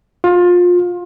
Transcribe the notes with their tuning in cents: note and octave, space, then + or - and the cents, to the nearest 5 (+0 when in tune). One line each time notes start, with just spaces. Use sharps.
F4 +25